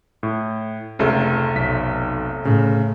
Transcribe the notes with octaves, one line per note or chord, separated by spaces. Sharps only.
A2
F1 C#2 A3
B1 B6
A2 C#3